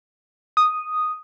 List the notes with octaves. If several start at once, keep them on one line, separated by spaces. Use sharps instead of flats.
D#6